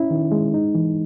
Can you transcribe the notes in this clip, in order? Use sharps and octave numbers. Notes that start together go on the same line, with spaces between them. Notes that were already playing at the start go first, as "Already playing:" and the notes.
Already playing: C#4 E4
D#3
G#3
D#4
E3